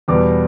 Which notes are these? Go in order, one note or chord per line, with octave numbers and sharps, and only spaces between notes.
E2 B2 G3 B3 D6